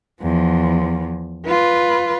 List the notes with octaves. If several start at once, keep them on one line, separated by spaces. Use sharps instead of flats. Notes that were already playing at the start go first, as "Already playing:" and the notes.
E2 F3
F4 B4